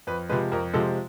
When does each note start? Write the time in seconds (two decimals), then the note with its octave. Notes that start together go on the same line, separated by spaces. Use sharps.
0.07 F2 B4
0.29 C3 F3 G#3 B4
0.52 F2 A#4
0.73 C3 F3 G#3 A4